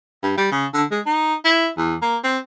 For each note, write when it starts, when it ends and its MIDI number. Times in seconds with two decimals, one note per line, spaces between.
0.23 0.33 43
0.37 0.48 55
0.51 0.66 49
0.74 0.84 50
0.91 1.01 56
1.06 1.35 63
1.44 1.69 64
1.77 1.96 40
2.02 2.17 58
2.24 2.38 60